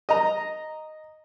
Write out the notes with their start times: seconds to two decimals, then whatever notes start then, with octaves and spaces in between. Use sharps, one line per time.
0.09 D#5 A#5